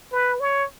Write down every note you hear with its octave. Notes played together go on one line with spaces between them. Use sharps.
B4
C#5